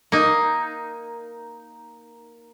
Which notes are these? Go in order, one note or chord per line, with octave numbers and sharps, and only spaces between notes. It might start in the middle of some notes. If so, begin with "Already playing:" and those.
A#3 D#4